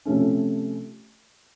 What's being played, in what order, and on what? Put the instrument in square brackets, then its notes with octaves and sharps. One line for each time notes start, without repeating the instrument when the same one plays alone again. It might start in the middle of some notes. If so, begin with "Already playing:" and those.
[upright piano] C3 F3 A3 C#4